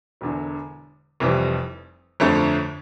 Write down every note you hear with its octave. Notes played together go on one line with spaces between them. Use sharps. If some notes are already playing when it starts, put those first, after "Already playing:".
E1 E2 D3
F1 F2 E3 G3
G1 F2 D3 A3